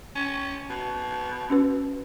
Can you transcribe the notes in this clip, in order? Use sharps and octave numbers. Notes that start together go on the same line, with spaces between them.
C#4
B2
C#4 F#4 B4